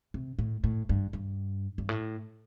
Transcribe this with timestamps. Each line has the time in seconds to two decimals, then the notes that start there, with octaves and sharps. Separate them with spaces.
0.14 C3
0.39 A2
0.64 A2
0.89 G2
1.13 G2
1.78 G2
1.89 A2